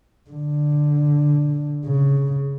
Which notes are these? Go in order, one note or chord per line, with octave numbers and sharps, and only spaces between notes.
D3
C#3